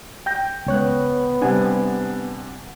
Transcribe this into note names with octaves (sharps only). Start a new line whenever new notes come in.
G5 G6 A#6
C#2 B3 C#5 F#6
C3 G3 D4 F#5 G#5